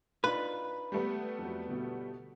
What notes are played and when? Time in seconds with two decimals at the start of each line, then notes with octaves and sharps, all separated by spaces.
0.24 D4 D#4 F4 B4
0.92 G3 A3 B3
1.39 F2 F#3
1.69 G1 B2